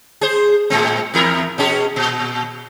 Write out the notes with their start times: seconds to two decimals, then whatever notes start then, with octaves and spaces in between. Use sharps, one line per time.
0.21 G#4 C5
0.70 A2 G#3 C4
1.14 E2 E4 A#4
1.58 B2 C#4 G#4
1.96 A#2